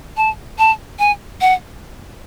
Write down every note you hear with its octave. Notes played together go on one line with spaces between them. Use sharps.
A5
A5
G#5
F#5